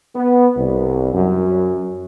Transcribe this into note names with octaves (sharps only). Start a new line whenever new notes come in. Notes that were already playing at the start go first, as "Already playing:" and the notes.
B3
C2
F#2